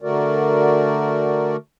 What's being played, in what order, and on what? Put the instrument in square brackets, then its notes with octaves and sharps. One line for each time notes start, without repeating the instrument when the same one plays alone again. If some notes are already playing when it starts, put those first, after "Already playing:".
[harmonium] D3 A3 F#4 A#4 D5